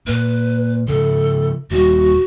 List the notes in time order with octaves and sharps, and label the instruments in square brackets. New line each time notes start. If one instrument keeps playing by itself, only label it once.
[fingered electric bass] A#2 [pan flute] B4
[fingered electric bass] C#3 F3 [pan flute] A4
[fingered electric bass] D#1 G3 [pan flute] F#4